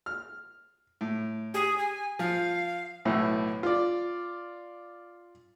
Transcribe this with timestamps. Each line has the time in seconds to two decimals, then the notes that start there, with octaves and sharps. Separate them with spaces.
0.06 F6
1.01 A2
1.54 G4 G#4
1.78 G#5
2.19 F3 F5
3.05 B1 A2 E3
3.63 F4 D5